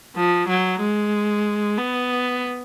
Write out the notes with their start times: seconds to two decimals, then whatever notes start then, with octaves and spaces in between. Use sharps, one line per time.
0.16 F3
0.48 F#3
0.80 G#3
1.77 B3